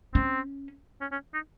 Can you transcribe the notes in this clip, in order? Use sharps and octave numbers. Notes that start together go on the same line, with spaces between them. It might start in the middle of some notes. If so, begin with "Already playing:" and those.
C4 C#4
C#4
C#4
D#4